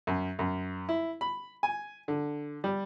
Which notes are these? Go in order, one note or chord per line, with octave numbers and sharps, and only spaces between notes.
F#2
F#2
E4
B5
G#5
D3
G3